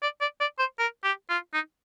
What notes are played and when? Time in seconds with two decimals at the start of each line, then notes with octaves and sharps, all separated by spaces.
0.02 D5
0.21 D5
0.40 D5
0.59 C5
0.79 A#4
1.04 G4
1.30 F4
1.54 D#4